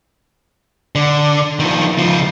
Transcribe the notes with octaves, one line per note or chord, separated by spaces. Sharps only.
D3
D#3 F3
C#2 F3